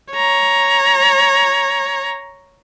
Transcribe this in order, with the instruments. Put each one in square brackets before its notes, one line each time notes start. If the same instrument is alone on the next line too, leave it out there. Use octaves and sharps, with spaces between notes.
[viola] C#5 A#5